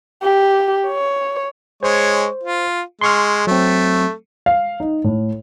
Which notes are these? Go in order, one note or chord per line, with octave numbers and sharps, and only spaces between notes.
G4
C#5
G#3 C5 C#5
F4
G#3 C6 C#6 F6
F#3 A3 C4
F5
D#4
A2